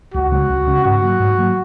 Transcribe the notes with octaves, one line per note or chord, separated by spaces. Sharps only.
C#2 F#4
C#3 G#3 C#4
C#2
C#3 G#3 C#4
G#2 F#4
F#3 A#3
G#2
F#3 A#3